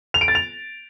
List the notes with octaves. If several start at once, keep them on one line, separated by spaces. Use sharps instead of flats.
F7
D7
A6
F7